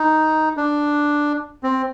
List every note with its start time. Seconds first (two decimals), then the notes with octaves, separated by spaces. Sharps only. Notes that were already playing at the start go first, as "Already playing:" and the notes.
Already playing: D#4
0.57 D4
1.63 C4